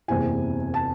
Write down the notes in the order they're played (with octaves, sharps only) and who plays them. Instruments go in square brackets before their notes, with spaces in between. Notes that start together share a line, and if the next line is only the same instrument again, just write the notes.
[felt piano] F#1 E2 C3 E3 G#5
A5